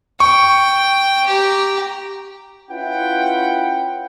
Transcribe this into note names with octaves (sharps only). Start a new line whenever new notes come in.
G5 C#6
G4 A#5
C#4 E4 F4 B4 F#5 G5